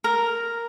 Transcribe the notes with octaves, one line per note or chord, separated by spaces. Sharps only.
A#4